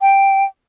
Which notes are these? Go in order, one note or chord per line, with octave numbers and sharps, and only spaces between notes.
G5